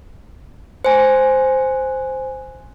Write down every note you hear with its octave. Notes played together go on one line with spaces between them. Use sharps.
C5 G#5